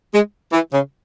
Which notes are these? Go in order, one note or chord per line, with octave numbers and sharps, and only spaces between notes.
G#3
E3
C#3